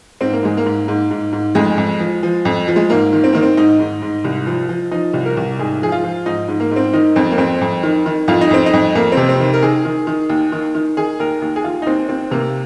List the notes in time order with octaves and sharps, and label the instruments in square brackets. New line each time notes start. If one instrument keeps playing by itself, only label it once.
[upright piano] G#2 C4
A#3
G#2 G#3
A#3
G#2
G#2
G#2
G#2
F2 G#3
F2
F3
F3
F2
F3
G#3
G#2 A#3
D#3
C4
D#3 A#3
C4
G#2 D#4
G#2
G#2
C2
F3
F3
F3 D#4
C2
A#4
C2
G#2 G#4
F3 G#4
F4
F3
G#2 D#4
G#2
A#3
G#2
C4
D#3 D#4
F2 C4
A#3
F2 C4
F2
D#3
D#3
F2 F4
D#4
F2 C4
D#4
F2
F2 A#3
C3 C4
C4
D#3
A#4
D#3 G#4
D#3
D#3
D#2
D#3
D#3
D#3 G#4
D#2 A#4
D#2
G#4
D#2 F4
D#4
D#2 C4
D#2 C4
C3 A#3